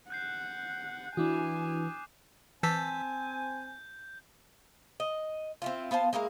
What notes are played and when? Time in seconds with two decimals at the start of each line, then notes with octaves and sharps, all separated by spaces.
0.10 F#5 F#6 G6 C7
1.17 E3 D4 E4 F#4 G#5 D6 D#6
2.63 E3 C4 G#5 A5 E6 G6 B6
5.00 D#5
5.62 C4 E4 F4
5.91 B3 F4 C5 A5
6.13 G#3 A#3 E4 A#4